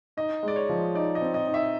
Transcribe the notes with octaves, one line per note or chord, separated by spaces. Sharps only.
D#4 D#5
G#3 D5
C#5
F3
D#4 D5
D#5
C4
D#5
D#4
E5